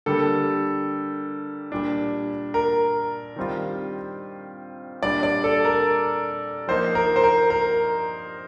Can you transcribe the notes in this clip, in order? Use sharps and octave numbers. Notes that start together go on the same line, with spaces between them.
D3 G3 A#3 A4
A#2 G3 D4
A#4
D#3 G3 C4 F4
A#2 G3 D4 D5
D5
A4
A#4
F3 A#3 D#4 C5
A#4
C5
A#4
A#4